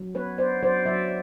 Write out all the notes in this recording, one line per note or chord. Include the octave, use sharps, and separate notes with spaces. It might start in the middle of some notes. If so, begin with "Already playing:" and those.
Already playing: F#3
B3 B4 C#5
B3 C5 D5
F#3 C5 D5
F#3 D5 E5